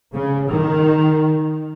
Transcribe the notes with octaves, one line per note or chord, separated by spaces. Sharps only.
C#3
D#3